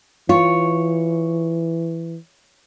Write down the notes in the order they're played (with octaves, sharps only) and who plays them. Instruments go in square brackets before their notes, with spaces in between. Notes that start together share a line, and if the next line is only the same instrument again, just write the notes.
[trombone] E3 [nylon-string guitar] F4 [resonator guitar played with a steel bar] C#5